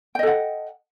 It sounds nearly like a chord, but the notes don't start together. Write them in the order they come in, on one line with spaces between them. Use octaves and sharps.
G5 D#5 A4 F#5